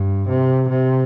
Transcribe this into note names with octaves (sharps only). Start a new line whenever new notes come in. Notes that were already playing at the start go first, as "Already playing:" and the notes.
Already playing: G2
C3
C3